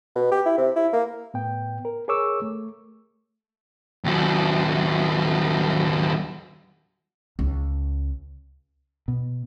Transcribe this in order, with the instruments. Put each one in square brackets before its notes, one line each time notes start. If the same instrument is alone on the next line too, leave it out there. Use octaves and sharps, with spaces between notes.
[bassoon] B2
G4
E4
C3
E4
A#3
[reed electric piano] A2 B3 G5
A#4
G#4 A#4 C#5 C#6 D6 E6
A3
[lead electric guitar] D#2 F#3
[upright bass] C#2
[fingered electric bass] B2